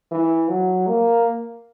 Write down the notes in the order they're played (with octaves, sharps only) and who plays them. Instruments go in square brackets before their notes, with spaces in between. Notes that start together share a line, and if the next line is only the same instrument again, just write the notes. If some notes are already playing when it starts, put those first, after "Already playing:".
[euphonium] E3
F#3
A#3